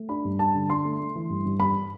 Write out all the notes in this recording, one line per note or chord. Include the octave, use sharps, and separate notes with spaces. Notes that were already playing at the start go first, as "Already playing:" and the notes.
Already playing: A3
D4 B5
G2
D4 A5
D3
D4 C6
A3
A3
E3
G2
G2
G2 B5